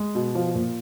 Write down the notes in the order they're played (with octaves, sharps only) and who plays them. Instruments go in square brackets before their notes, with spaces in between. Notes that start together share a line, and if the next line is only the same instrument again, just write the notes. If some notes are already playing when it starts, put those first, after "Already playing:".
Already playing: [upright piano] G#3
B2
F3
A#2